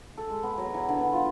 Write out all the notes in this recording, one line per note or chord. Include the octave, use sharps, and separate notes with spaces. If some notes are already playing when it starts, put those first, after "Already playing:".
A4
G#3
B3
F#3
E3
D3
B3
F4